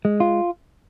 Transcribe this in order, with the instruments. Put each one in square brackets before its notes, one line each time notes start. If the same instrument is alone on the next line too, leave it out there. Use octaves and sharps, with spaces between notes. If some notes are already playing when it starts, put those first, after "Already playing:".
[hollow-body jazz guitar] G#3
F4